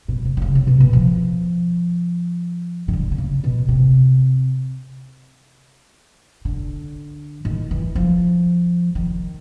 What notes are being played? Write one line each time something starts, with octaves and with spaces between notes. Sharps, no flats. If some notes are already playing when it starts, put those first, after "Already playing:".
B2
C3
D3
C#3
C3
B2
B2
F3
D#3
D3
D3
C#3
B2
C3
D3
D#3
E3
F3
D#3